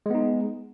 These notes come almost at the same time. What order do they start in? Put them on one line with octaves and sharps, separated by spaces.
G#3 B3 D#4